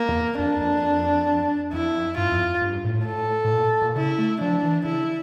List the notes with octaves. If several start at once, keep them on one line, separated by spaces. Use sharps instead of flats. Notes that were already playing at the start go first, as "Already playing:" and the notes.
Already playing: A#3
E2
F2 D4
F2
F2 E4
G2 F4
F2
G2
A2
A4
A2
A#2
A#2
C#3 E4
A3
F3 D4
E3
C#3 E4